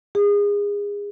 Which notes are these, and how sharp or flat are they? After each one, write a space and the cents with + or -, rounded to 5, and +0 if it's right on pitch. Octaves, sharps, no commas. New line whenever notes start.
G#4 -30